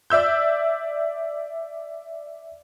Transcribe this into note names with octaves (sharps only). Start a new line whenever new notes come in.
D5 E5 E6 G6